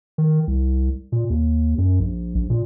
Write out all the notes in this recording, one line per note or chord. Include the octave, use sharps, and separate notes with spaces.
D#3
C2
A#2
D#2
F#2
A#1
A#1
A#2